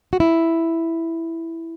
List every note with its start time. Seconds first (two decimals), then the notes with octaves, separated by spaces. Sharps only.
0.13 F#4
0.20 E4